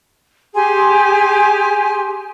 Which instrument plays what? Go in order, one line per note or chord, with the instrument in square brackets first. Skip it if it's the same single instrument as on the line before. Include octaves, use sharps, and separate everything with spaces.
[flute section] G4 G#4 G#5 C6